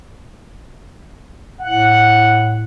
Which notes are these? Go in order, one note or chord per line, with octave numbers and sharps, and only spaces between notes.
A2 F#5